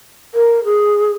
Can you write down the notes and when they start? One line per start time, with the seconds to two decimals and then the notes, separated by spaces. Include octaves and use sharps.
0.34 A#4
0.64 G#4